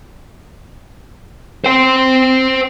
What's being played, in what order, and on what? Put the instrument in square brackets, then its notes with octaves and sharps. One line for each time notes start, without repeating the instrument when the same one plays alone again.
[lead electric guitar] C5 G5